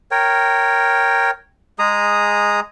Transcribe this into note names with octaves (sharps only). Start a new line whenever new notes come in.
A#4 C#5 G5
G#3 G#4 A#5 D#6